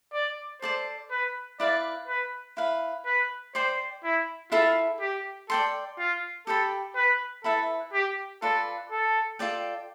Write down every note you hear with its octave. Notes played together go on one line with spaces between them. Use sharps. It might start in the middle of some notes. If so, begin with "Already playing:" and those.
D5
A4 C5 D5 A5
B4
E4 B4 D5 F5
B4
E4 B4 F5 B5
B4
C5 D5 G5 C6
E4
E4 F4 A4 E5 B5
G4
A4 D5 G5 C6
F4
G4 A4 D5 G5 B5
B4
E4 A4 B4 E5 B5
G4
F4 A4 B4 D5
A4
F4 A4 D5 G5